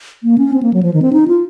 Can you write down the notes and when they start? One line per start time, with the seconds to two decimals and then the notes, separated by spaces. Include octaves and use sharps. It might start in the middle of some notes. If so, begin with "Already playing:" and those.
0.23 A#3
0.38 C#4
0.54 C4
0.63 A#3
0.73 F#3
0.83 F3
0.93 D#3
1.02 C4
1.13 D#4
1.28 F4